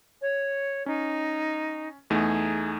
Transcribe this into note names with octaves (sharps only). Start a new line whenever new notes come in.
C#5
C#4 D#4
E2 A3 D#4 G#4